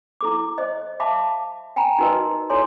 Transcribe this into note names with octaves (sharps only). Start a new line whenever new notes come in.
E4 A4 D6
C5 D#5
E5 F5 A5 B5 D6
G5 G#5 A#5 B5
D#4 F#4 A#4 B4 D#5
E4 A4 C#5 G#5 C6